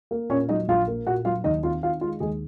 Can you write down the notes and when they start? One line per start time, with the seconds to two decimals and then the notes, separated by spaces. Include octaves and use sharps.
0.11 A#3
0.30 A#2 C#4 C#5
0.49 F#3 D#4 D#5
0.68 A#1 F4 F5
0.87 A#3
1.07 A#2 F#4 F#5
1.25 F#3 F4 F5
1.44 D#2 D#4 D#5
1.63 C4 F4 F5
1.83 D#3 F4 F5
2.01 G#3 F4 F5
2.20 D#2 G#3 G#4